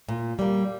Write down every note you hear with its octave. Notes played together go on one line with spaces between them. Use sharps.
A#2
G3 A#3